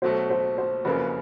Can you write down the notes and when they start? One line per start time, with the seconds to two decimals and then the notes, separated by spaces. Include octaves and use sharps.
0.02 B1 B2 F#3 A3 C5
0.30 C5
0.58 C5
0.85 F#1 F2 C#3 F#3 A#3 B4